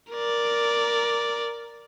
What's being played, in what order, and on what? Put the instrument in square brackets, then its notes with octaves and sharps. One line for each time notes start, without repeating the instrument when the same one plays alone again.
[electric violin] A#4 D5